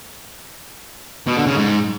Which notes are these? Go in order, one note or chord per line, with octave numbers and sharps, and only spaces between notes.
B2
D3
C#3
G#2